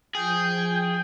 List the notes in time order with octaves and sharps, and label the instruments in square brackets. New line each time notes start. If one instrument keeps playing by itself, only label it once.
[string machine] F3 G#5 [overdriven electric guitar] G#4 [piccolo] G5